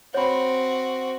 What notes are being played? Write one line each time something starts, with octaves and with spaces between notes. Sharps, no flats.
C4 F#4 C#5 B5